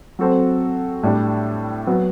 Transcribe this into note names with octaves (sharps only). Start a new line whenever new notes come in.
F#3 C4 F#4 A4 C5
A2 G3 D4
F#3 B3